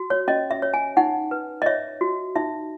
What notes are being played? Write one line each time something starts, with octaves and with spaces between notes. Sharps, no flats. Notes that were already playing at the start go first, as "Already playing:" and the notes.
Already playing: F#4
C#5
C#4 D#5
E5
C#5
G#5
D#4 F#5
B4
D#5
C#5 E5
F#4
D#4 E5